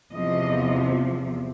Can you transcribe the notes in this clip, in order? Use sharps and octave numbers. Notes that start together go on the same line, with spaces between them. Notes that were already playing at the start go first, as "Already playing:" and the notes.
E2 C3 F3 D#5